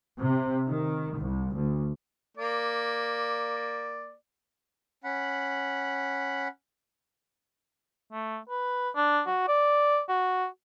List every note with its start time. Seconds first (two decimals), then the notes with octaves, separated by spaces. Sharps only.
0.20 C3
0.67 D#3
1.18 C2
1.54 D2
2.37 A#3 D5
5.04 C#4 F#5 B5
8.13 A3
8.49 B4
8.96 D4
9.27 F#4
9.48 D5
10.09 F#4